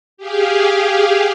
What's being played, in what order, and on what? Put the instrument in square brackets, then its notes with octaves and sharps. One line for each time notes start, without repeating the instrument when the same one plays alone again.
[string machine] G4 G#4 F5